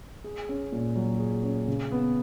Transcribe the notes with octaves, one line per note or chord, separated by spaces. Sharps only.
G#4
C#4
A#2
F#3
G#4
C#4
C#3
B3